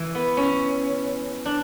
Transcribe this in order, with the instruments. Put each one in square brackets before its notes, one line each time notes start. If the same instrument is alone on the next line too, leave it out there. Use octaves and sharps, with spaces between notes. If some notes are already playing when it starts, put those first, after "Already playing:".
Already playing: [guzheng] E3
B3
C#4
D4